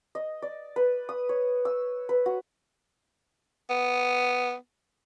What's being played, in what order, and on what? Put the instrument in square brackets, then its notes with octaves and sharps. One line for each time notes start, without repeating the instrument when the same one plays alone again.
[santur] D#5
D5
B4
D#6
C#5
E6
B4
F#4
[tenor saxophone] B3